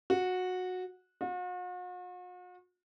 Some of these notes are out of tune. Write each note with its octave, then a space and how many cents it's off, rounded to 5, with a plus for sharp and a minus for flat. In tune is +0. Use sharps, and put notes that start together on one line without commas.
F#4 -15
F#4 -45